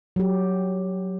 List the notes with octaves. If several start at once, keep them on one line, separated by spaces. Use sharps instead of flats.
F#3 G4